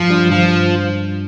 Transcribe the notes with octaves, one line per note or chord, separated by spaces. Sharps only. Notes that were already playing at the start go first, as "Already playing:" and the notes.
Already playing: G2 F3
G3 D4 F4
G2 F3